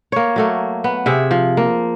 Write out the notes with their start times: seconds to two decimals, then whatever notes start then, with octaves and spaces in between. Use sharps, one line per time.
0.12 A#3 C#5
0.36 F#3 A3 A#3
0.84 B3
1.06 C3 G#4 E5
1.31 F3
1.57 A#3